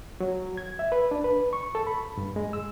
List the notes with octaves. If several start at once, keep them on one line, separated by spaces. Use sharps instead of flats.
F#3
G#6
E5
B4
D4
B4
C#6
A4
B5
G2
G#3
E6